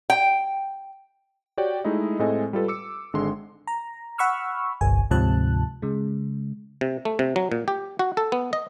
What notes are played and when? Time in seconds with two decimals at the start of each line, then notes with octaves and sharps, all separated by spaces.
0.10 G5
1.57 F#4 G4 C#5 D5 G5
1.84 G#3 A3 D#4 E4 D#5
2.19 A2 G#3 C4 A4 D#5 G#5
2.53 G3 F4 A4 B4
2.68 D6 E6 C#7
3.13 G#1 D3 G#3 C6
3.67 A#5
4.18 F#5 B5 C#6 E6 F6
4.81 G1 C2 G#5
5.10 D2 G#2 C3 F3 A5 F#6
5.82 C#3 G#3
6.81 C3
7.05 A3
7.19 C3
7.36 F#3
7.52 A#2
7.68 G4
7.99 F#4
8.17 A4
8.32 B3
8.53 D#5